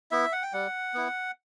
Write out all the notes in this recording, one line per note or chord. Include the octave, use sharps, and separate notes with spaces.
B3 E4 E5
F#5
G5
G3 F#5
B3 E4